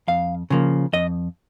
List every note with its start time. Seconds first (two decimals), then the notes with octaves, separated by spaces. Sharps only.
0.08 F2 F5
0.50 C#3 F3 A#3
0.93 F2 D#5